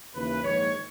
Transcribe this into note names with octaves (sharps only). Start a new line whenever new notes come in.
D#2 C#3 E3 B4
A#1 G#2 D#3 C#5